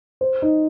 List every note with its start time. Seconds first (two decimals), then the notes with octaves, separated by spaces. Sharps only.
0.21 C5
0.42 D#4